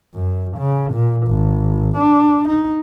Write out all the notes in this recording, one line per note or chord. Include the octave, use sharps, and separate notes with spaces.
F#2
C#3
A#2
G#1
D4
D#4